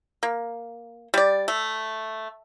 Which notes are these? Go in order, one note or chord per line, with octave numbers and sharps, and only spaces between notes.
A#3
G3 D5
A3